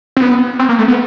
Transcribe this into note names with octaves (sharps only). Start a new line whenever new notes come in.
C4
B3
C4
A#3
A3
B3